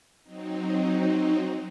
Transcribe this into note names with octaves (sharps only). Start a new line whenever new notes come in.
F#3 C4 D#4